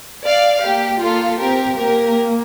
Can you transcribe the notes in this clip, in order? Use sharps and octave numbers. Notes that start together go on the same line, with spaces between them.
D5 F5
A#3 G4
A#3 F4 A4
C4 G4 A#4
A#3 G4 A#4